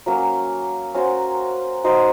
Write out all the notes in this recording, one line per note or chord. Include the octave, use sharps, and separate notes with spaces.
F#3 A#3 C#4
C#4 F#4 C5
D#4 F#4 C5